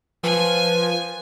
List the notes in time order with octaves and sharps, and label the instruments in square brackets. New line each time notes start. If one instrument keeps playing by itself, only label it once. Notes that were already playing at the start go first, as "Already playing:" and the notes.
[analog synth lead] F3 [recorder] B4 [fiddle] G#5